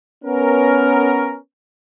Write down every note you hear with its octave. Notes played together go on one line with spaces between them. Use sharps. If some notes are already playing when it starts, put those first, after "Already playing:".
B3 C#4 A#4